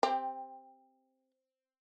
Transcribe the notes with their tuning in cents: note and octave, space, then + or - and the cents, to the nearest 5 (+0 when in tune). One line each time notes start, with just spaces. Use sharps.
C4 +0 G4 +20